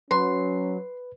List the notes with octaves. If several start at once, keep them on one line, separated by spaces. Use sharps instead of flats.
F#3 C#4 B4 C6